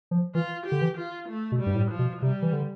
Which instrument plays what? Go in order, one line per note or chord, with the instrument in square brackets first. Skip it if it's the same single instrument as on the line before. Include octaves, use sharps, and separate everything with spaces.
[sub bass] F3
[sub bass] E3 [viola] F4
[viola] G4
[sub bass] D3
E3
[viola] F4
A3
[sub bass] B2
[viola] G3
[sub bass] G2
A2
[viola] F3
[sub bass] B2
[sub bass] C3 [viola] G3
[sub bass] E3
D3